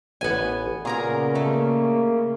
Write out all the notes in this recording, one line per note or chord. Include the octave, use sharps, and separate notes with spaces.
A1 B3 C#5 G#5
A#2 C#3 B3 G#4 A#4 A#5
A3 A#3